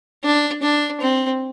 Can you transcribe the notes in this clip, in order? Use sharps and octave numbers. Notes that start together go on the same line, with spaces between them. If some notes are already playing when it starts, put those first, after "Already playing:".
D4
D4
C4